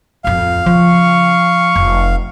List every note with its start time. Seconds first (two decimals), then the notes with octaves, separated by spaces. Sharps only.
0.24 D1 F2 F5
0.66 C#3 F3 C#6
1.76 F1